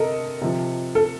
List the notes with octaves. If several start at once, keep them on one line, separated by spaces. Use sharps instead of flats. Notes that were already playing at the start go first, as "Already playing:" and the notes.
Already playing: C3 A4 A#4 D#5
C3 F3
A4